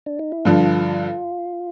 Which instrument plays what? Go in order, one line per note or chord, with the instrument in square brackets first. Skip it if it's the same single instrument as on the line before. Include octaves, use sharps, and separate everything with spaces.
[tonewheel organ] D4
D#4
E4
[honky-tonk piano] G2 D3 F3 [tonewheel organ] F4